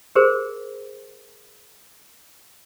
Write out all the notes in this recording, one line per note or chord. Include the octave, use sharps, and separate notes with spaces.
G4 G#4 A#4 C5